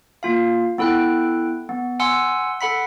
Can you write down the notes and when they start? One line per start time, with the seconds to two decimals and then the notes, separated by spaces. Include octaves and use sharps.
0.23 A#3 F4 F5
0.78 B3 E4 A4 G5 F#6
1.69 B3
2.00 F#5 G#5 C6 E6
2.61 A4 F#5 B5 B6